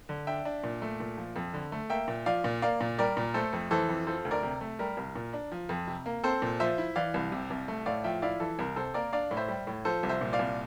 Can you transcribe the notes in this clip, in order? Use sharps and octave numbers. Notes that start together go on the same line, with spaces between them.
D3
D4 E5 G5
D4
A#2
A3
A#2
F3
F2
D3
A3
A#3 E5 G5
A#2
F3 D5 F5
A#2
A#3 D5 F5
A#2
G3 A#4 D5
A#2
A3 A4 C5
F2
E3 A4 C5
F2
F3 A4 C5
D2
A#4 D5
C3
A3
G3 A#4
C2
A#2
D4
F3
F2
C3
A#3
C4 A4 C5
A#2
F3 C5 E5
E4
E3 D5 F5
C2
C3
C2
A3
A2 D5 F5
F3 E5 G5
E4 D5 F5
E3 A4
C2 A#4
C3 A4 C5
A#3 A#4 D5
D4 D5 F5
A2
C5 E5
G3
A2
F3 A4 C5
C2
C5 E5
A#2
D5 F5
C2